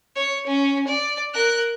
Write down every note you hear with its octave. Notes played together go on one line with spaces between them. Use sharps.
C#5
C#4
D5
A#4 F#6